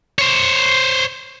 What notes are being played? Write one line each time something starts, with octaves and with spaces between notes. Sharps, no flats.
C5 C#5